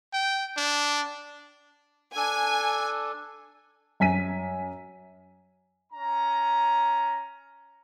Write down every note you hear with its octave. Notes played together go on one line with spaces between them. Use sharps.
G5
D4
D4 A4 G#5
F#2 G#5 B6 D#7
C#4 A#5